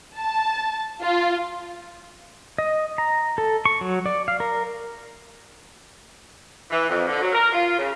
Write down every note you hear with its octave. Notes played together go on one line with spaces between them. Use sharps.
A5
F4
D#5
A#5
A4
C#6
F#3
D5
F5
A#4
E3
F2
D3
F#3
A#4
F4
C#3